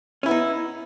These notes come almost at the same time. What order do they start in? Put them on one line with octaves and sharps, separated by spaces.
C#4 E4 B3 D#4